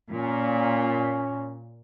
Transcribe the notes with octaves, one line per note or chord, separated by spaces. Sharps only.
A#2 C#4